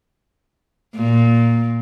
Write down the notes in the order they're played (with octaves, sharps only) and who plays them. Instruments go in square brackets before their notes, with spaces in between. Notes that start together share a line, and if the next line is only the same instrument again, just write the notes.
[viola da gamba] A#2